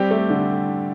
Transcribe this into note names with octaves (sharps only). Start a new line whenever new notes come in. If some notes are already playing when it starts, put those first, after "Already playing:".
Already playing: G3 C4 G4
A3
D3